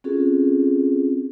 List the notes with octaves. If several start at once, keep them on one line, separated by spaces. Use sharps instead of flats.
C4 C#4 F4 F#4 G#4 A4